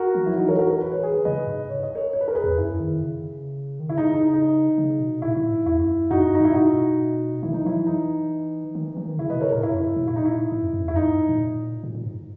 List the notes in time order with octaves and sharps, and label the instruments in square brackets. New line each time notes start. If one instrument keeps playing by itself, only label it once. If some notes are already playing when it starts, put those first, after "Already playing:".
Already playing: [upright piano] F#4 A#4
[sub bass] E3
[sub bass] F#3 [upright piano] E4
[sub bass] E3 [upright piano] D#4 F#4
[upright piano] A#4 C#5
F#4 A#4
F#4 A#4
B4
C#5
G#4 B4
[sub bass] C#3 [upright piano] B4 D#5
[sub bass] G#2
[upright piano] C#5
D#5
A#4 C#5
C#5
B4
A#4
G#4 B4
[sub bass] E2
[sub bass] F#2 [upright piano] E4
[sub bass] D#3
C#3
D#3
[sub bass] C#3 [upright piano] E4
[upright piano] D#4
D#4
D#4
[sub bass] C#3
B2
[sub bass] A#2 [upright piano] E4
[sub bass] A#2
G#2
[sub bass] E2 [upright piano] E4
[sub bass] F#2
[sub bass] F#2 [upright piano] D#4 F#4
[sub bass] G#2
[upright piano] D#4
[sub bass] G#2 [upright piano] E4
[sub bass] B2 [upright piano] D#4 F#4
[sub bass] D#3 [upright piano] E4
[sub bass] E3 [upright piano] D#4
[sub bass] F#3 [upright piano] E4
[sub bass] E3
[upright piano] D#4
[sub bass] D#3
E3
E3
D#3
[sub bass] C#3 [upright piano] E4
[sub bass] B2 [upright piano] B4 D#5
[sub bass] C#3 [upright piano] A#4 C#5
[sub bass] A#2 [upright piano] A#4 C#5
[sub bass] G#2 [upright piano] E4
[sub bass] F#2
B2
[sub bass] A#2 [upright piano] E4
[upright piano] D#4
E4
[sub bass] G#2
F#2
F#2
[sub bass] E2 [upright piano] E4
[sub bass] F#2 [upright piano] D#4
[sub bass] G#2
A#2
A#2
A#2
G#2